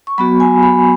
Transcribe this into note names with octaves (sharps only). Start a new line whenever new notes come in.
C#6
F#3 B3 F#4 B5
G#5
B5